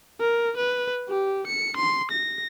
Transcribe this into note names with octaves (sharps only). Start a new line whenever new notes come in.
A#4
B4
G4
C#7
C6
A#6